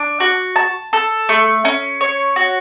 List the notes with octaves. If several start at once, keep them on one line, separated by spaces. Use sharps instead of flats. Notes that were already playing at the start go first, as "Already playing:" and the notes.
Already playing: D4
F#4
A5
A4
A3
C#4
C#5
F#4